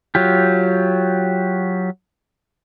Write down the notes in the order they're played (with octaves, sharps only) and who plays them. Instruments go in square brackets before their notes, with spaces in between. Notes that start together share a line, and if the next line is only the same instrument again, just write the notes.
[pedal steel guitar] F#3 F4 G4